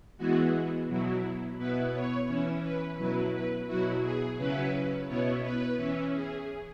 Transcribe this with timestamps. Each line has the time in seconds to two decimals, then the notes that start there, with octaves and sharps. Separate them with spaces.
0.18 E3 G#3 B3 E4 F#4
0.88 B2 F#3 E4
1.58 B2 B3 E4 B4
1.93 C#5
2.28 E3 C#4 E4
2.63 B4
2.98 B2 F#3 E4 B4
3.33 B4
3.68 B2 F#3 E4 F#4
4.03 G#4
4.38 C#3 F#3 C#4 E4 B4
5.08 B2 B3 E4 C#5
5.43 B4
5.77 E3 C#4 E4
6.12 G#4